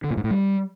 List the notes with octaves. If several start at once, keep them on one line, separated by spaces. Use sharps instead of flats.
D3
A#2
G#2
A2
G3